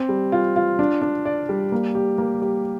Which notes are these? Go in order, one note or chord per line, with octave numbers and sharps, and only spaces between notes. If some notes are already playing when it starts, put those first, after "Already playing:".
Already playing: C4
G3
F4
F4
D4
D4
D5
G3
A#3
G4
A#3
G4